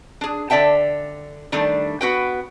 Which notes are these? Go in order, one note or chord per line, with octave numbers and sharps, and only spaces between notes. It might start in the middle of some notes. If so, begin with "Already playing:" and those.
D4 G#4
D3 D5 E5 G5 A5
D#3 G3 A3 D4
B3 F#4 B4 G5